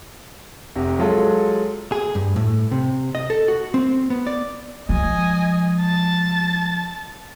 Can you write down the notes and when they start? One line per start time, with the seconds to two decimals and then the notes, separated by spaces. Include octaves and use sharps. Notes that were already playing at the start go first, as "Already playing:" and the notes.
0.76 F1 C3
0.99 F#3 G#3 F4 A4
1.92 G#4
2.15 G2
2.36 A2
2.72 C3
3.15 D#5
3.30 A4
3.48 F#4
3.74 C4
4.10 B3
4.27 D5
4.89 F3 G#3 D#5 G#5
5.81 A5 A6